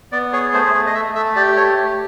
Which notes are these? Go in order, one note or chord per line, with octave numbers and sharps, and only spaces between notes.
B3 D5
G#4 C#5
A3 C5
A3
D#5
A3 E5
A3 E5
G4 D5
A3 C#5
G4